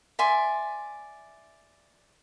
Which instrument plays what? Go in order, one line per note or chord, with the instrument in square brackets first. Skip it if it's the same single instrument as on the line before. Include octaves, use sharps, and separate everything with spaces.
[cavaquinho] D5 E5 G#5 C6